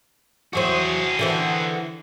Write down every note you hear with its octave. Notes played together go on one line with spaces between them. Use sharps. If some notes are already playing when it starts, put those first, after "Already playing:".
E2 F#3 F#4 G#4 C5
D3 E3 C5